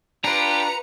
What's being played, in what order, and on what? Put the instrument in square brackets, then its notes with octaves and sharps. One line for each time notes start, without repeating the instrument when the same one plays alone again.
[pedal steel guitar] D4 F4 [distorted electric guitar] G4 [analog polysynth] B4 C#7 [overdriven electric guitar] A#5